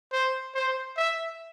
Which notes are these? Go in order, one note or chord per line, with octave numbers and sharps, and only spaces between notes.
C5
C5
E5